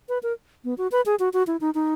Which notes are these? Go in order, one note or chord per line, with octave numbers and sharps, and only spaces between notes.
B4
A#4
B3
F#4
B4
G#4
F#4
F#4
E4
D#4
D#4